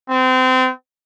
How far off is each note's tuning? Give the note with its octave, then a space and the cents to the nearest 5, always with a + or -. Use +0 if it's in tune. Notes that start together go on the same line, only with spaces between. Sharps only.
C4 -30